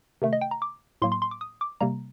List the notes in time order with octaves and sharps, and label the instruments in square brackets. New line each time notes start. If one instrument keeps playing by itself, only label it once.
[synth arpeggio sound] C3 D#3 A3
D#5
G5
A#5
D6
A2 F#3 A#3 C6
C6
C6
D6
D#6
D6
C3 G3 A#3 A#5